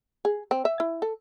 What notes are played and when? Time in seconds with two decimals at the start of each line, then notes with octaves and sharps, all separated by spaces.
0.25 G#4
0.51 C4
0.65 E5
0.80 E4
1.02 A4